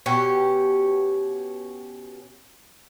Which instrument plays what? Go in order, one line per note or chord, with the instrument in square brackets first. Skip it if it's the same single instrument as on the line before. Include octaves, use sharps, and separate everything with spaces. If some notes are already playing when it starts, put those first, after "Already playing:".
[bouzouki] B2 C#4 G4